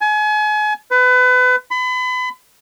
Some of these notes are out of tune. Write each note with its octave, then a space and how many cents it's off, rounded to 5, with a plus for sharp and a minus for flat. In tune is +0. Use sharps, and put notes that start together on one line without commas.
G#5 +35
B4 +30
B5 +35